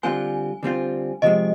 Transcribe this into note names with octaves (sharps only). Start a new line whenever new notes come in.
D3 G3 C4 F4 C5 G#5
D3 G3 C4 F4 C5
C3 F3 G#3 D#5